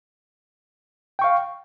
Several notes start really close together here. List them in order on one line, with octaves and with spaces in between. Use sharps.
G5 C#6 F5